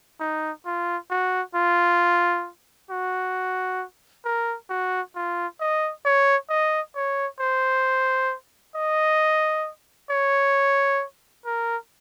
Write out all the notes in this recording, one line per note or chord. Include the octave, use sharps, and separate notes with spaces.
D#4
F4
F#4
F4
F#4
A#4
F#4
F4
D#5
C#5
D#5
C#5
C5
D#5
C#5
A#4